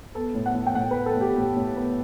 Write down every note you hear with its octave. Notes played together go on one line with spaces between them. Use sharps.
B3 A4
A2
F#5
A2
G5
A2 F#5
B4
B3
A4
A2
G4
A2
A2
B3